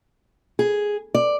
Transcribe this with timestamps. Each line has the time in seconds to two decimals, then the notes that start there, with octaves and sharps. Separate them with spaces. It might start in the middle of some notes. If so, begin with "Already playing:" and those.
0.59 G#4
1.15 D5